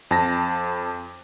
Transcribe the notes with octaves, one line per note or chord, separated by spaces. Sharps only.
F2 A5 A#6